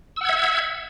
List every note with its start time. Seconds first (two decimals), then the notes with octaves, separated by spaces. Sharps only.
0.16 E6
0.21 F#5
0.25 G#6
0.29 E5